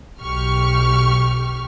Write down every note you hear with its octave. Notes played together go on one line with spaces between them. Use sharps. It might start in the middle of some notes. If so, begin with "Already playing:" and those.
B1 G4 C#6 F6